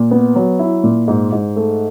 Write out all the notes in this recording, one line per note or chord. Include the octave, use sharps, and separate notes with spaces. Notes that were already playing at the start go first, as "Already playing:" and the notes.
Already playing: A#2
B3
F#3
E4
A#2
G#2
G#2
A3